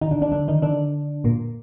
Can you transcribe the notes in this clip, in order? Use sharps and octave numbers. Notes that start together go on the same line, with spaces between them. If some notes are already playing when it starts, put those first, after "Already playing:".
D#3 D#4
D3 D4
D3 D4
D3 D4
D#3 D#4
D3 D4
A#2 A#3